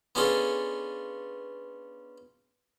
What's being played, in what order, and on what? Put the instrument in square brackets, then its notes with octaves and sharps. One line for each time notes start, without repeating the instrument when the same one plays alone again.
[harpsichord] B3 C#4 D4 F4 G#4 A4